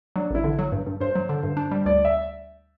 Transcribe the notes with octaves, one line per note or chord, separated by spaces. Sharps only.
F#3 D4
A1 E4
D3
F#3
G2
G2
G2 C5
F#3
D3
G2
D4
G3
D2 D5
E5